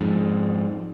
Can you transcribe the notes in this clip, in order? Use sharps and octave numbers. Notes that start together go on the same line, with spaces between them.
F2 G#2